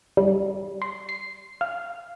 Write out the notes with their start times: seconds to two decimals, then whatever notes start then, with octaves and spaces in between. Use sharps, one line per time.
0.17 G3
0.82 C6
1.09 C7
1.61 F5